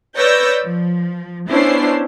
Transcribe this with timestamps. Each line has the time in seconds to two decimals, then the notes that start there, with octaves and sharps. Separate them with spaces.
0.17 B4 C#5 D5 E6 G6 A#6
0.63 F3
1.50 B3 C#4 D4 E4 C5 C7